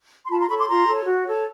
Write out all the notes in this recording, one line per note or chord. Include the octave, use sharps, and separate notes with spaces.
C6
F4 A5 B5
A#5 C6
A4 C#5 B5 C#6
C6 D6
F4 A#5 C6
A4 C#5
F#4
A4 C#5